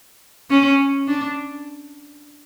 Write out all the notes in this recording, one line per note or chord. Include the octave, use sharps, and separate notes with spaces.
C#4
D4